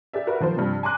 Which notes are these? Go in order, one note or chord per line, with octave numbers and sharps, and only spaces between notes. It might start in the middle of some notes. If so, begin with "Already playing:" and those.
G4 G#4 D5 E5
F#4 A#4 B4 E5
D#3 F3 A#4 C5
G2 C3 F3
G#5 A#5 C6 D6 F#6